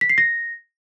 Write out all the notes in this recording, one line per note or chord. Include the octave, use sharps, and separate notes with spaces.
B6
C7
A#6